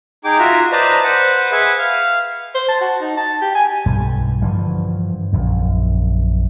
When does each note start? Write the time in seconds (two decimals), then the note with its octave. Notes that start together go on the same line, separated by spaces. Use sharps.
0.24 D#4 G#4 G5 D6
0.39 F4 F#4 E5 A#5
0.72 B4 C5 D5 D#5 A5 A#5
1.04 B4 C5 F#5
1.52 G#4 B4 E5 F#5
1.78 F5
2.55 C5
2.69 A5
2.81 F#4
3.01 D#4
3.17 A5
3.41 G4
3.55 G#5
3.86 B1 G2 G3
4.42 G2 D3 E3 F3
5.32 A#1 F#2